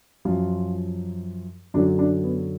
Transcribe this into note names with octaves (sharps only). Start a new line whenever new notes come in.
F#2 F3 F4
F#2 D3 F#3 D4
D4
B3